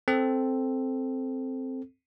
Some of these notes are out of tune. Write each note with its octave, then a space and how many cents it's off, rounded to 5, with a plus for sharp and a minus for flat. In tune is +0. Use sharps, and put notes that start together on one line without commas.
C4 +0 A4 +0